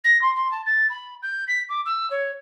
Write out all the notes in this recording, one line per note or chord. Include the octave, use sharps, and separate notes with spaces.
A#6
C6
C6
A5
A6
B5
G6
B6
D6
E6
C#5